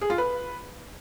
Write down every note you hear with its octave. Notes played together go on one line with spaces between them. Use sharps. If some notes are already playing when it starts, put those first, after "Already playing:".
G#4
F4
B4